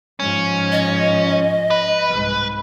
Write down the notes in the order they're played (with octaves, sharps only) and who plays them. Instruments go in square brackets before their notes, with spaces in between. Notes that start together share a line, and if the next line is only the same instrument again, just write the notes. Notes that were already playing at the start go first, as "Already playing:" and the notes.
[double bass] G#2 F3 [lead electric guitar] C#4
[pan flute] D#5
[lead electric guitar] B4
[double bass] C2 G#2